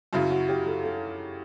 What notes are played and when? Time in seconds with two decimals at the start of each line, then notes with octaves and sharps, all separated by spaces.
0.13 F#2 C#3 F#3 E4
0.30 F#4
0.49 G4
0.66 A4
0.83 A4